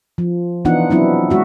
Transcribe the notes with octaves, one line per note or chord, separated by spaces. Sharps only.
F3
E3 B3 D4 D#4 F4 F#5
F#3 B3 C4 D4 E4
G#3 F#4 E5